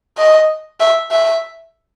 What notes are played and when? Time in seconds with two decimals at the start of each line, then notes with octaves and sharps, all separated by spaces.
0.18 D#5
0.80 E5
1.11 E5